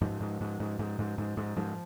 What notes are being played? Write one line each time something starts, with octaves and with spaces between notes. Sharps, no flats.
G#2 F3
G#2
G#2
G#2
G#2
G#2
G#2
G#2
G#2 F3